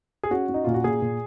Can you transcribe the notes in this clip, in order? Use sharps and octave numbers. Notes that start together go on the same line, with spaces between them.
G#4
C#4 F#4
C#4
D#4
A#2 F4
F#4
A#2 G#4
A#2